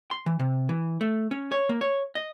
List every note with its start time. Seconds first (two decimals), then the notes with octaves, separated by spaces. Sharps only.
0.11 C6
0.26 E3
0.39 C3
0.69 E3
1.01 A3
1.31 C#4
1.52 C#5
1.69 A#3
1.81 C#5
2.15 D#5